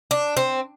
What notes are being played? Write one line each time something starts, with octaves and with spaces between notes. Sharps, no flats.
D4
C4